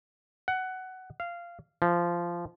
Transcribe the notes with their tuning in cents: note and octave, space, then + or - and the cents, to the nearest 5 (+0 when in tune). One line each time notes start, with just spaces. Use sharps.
F#5 +15
F5 -15
F3 -15